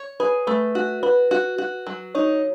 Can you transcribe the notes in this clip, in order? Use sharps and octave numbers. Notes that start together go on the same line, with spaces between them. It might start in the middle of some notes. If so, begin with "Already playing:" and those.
Already playing: C#5
G#4 B4
A3 B4
F#4
F#4 B4
F#4
F#4
F#3
D#4 C#5